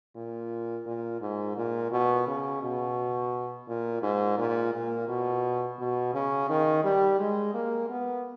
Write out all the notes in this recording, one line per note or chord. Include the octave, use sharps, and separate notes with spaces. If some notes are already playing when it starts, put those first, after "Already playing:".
A#2
A#2
G#2
A#2
B2
C#3
B2
A#2
G#2
A#2
A#2
B2
B2
C#3
D#3
G3
G#3
A#3
B3